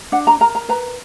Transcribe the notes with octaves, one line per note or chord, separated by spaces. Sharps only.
D4 F#5
A#5
A#4 A#5
A#5
B4 A#5